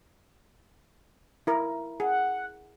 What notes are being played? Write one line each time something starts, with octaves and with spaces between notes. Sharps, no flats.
E4 A#4
G#4 F#5